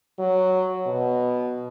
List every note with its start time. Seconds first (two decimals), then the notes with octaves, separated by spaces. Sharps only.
0.19 F#3
0.87 B2